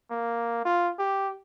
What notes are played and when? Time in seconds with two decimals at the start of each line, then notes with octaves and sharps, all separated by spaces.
0.11 A#3
0.65 F4
0.99 G4